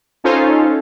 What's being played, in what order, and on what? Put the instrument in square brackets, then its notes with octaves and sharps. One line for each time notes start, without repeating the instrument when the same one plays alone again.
[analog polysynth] C#4 D#4 F4 A4 C5